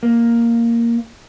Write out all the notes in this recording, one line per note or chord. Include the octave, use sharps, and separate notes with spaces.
A#3